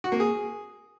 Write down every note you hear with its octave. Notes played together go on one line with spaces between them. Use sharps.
F#4
A#3
G#4